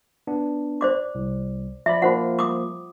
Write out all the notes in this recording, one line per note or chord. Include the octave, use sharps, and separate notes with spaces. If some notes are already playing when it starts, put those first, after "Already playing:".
B3 D4
C5 D5 D6
C2
F3 D5 E5 B5
F3 A#3 F4 C5 F#5
D6 D#6